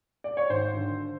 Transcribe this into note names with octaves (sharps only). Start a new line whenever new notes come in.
D5
C#5
G#1 C5
D3